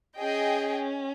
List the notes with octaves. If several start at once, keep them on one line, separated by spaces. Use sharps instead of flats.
C#4 G#4 D#5 G5